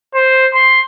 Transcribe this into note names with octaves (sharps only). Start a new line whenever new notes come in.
C5
C6